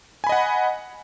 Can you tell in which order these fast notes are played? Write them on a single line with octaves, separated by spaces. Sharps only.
G#5 B5 D#5 F#5